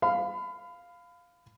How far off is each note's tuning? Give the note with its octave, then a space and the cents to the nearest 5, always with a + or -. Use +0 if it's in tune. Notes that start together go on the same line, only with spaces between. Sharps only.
F5 +0 B5 +30